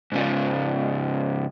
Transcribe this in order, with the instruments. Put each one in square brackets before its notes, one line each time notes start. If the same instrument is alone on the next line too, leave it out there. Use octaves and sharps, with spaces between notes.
[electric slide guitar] G#2 C#3 F4